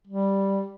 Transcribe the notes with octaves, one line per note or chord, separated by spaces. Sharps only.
G3